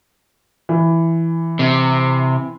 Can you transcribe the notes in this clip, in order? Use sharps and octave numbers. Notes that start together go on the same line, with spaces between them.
E3
C3